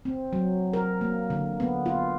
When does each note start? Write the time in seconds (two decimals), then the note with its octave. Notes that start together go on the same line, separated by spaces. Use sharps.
0.05 C4
0.33 F#3
0.73 A#4
1.01 A#3
1.30 D3
1.60 B3
1.86 F4